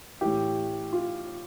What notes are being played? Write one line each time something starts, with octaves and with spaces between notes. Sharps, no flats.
A2 E3 G4
F4